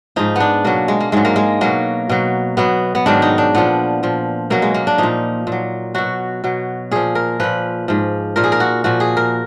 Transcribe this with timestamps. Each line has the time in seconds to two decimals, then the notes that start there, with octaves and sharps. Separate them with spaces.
0.16 G#2 F3 D#4
0.36 B3 D4
0.65 B2 F#3 A#3
0.88 G#3
1.00 A#3
1.12 G#2 F#3 G#3
1.25 A#3
1.36 G#3
1.61 B2 F#3 A#3
2.09 B2 F#3
2.57 B2 F#3 B3
2.95 B3
3.06 G#2 D#3 F#3 D4
3.22 D#4
3.38 D4
3.55 A#2 F3 B3
4.03 A#2 F3
4.50 B2 F#3 A#3
4.62 G#3
4.74 A#3
4.87 D4
4.98 A#2 F3 D#4
5.47 A#2
5.52 F#3
5.95 B2 F#3 F#4
6.44 B2 F#3
6.91 A#2 F3 G#4
7.15 A#4
7.40 A#2 F3 B4
7.88 G#2 F3
8.36 A#2 F3 A#4
8.44 G#4
8.52 A#4
8.60 F#4
8.84 A#2 F3 F#4
9.00 G#4
9.17 A#4